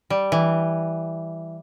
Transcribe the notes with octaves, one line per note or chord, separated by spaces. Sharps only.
G3
E3